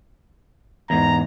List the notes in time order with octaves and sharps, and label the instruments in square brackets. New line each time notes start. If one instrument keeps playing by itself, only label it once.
[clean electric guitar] E2 G#2 [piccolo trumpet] A#5